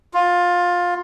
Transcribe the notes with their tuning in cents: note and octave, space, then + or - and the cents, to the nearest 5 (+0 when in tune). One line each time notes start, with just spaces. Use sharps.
F4 +15